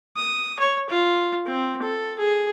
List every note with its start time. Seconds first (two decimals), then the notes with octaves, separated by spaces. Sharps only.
0.16 D#6
0.59 C#5
0.89 F4
1.46 C4
1.82 A4
2.18 G#4